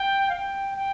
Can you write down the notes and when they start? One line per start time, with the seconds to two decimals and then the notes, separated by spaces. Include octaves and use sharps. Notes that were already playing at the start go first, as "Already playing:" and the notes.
Already playing: G5
0.29 F5
0.35 G5
0.76 G5